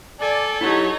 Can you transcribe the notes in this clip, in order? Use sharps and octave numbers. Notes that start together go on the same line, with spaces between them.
A4 D5 G#5
F#3 D#4 E4 G4 C#5